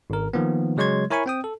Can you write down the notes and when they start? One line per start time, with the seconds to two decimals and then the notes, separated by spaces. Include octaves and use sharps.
0.10 G#1 A#4
0.33 D#3 F3 A#3 B3
0.77 C#3 F#3 G#3 C#5 C6 G#6
1.10 E4 A#4 C#5 G#5 B5 C#6
1.26 C4 G5 D#6
1.44 A4